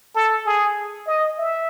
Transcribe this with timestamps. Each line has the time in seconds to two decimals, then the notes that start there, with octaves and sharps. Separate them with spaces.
0.15 A4
0.45 G#4
1.07 D#5
1.38 E5